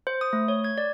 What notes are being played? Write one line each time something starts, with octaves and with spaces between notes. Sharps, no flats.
C5
D#6
A3
C#5
G#6
D5